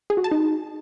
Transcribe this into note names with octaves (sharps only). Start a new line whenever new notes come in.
G#4
F#4
A5
D#4